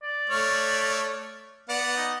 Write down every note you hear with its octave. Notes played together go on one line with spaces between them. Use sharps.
D5
A3 C#5 F6
B3 D5 F#5
D#4